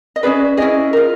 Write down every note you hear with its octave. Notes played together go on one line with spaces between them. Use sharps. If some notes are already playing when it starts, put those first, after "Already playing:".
D#5
C#4 E4 G#4 B4 D5
C#4 E4 G#4 D#5
F4 A#4